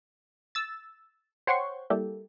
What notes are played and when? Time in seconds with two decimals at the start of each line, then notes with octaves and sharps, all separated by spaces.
0.55 E6 A6
1.47 C5 C#5 F#5 G5 C6 C#6
1.90 G3 A#3 E4 G4 A4